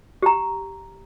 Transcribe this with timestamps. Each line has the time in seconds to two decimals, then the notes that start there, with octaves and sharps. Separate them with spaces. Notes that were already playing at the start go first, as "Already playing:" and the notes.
0.22 G4 A#5